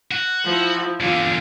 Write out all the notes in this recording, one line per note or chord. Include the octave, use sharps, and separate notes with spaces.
F#4
F3 E4
E2 D3 F4 F5